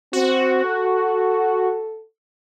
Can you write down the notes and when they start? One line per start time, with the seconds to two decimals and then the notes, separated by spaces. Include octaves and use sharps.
0.13 C4 F#4
0.65 A4